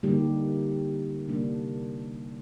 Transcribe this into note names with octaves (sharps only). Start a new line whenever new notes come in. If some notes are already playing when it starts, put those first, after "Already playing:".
D3 G3 A#3 D#4 G4
C3 G3 A#3 D4